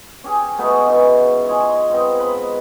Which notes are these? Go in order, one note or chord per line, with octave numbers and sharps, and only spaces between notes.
C#4 G4 G#4
F#3 G#3 A3 B3
G#2 C#3 E3 F#4
G#3 F4 C#5 C6
G#2 B3 C4 D#5
B4 D#5